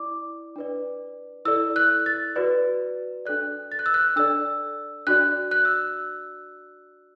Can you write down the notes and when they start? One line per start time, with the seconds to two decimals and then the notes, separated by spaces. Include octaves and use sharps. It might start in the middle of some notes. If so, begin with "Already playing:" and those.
Already playing: E4 D5 D6
0.56 D4 B4 D5
1.45 E4 A4 D5 E6
1.76 F#6
2.06 A6
2.36 F#4 B4 D5
3.26 D4 A4 D5 F#6
3.72 A6
3.79 F#6
3.86 E6
3.94 F#6
4.16 D4 A4 D5 E6
5.07 D4 F#4 D5 F#6
5.51 F#6
5.65 E6